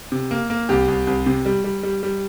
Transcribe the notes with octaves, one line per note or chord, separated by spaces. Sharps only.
C3
A#3
A#3
C2 G4
C2
C2
C3
G3
G3
G3
G3